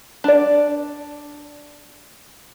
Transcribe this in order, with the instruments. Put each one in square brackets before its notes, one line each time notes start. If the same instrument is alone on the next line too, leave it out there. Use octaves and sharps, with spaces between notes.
[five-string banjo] D4 D5